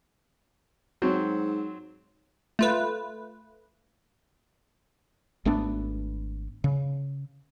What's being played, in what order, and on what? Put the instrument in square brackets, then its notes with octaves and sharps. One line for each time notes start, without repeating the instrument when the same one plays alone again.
[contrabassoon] G#2 [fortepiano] F#3 C4
[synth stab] A3 F4 B4
[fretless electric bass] G#1 A3 B3 D4
C#3